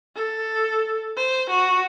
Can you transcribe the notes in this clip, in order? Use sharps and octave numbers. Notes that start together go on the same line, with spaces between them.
A4
C5
F#4